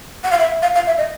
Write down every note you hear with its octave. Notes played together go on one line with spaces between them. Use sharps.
F#5
F5
E5
F5
F5
E5
D#5